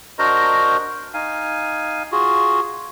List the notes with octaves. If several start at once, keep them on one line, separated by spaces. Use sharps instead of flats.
D4 F#4 A#4 C5 D#5 A#5
D#4 F5 G#5
F4 F#4 G#4